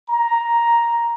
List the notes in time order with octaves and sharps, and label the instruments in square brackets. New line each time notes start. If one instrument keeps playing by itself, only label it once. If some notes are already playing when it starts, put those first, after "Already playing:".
[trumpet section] A#5